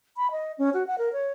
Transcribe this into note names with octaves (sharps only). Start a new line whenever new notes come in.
B5
D#5
C#4
F#4
F#5
A#4
C#5